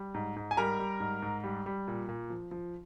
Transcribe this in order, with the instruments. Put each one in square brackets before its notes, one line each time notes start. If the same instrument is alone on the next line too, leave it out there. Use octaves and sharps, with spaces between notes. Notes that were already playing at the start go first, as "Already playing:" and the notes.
Already playing: [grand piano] G3
G#2
G#2
G#5
G3 A#4 A#5
G3
G#2
G#2
G3
G3
A#2
A#2
F3
F3